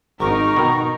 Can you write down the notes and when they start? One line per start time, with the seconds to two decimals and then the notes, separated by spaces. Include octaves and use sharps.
0.20 G#1 D#4 A#4 A#5 C#6
0.56 B2 D#3